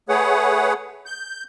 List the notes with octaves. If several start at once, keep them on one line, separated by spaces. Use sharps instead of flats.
A3 G#4 B4 C#5 F#5
G6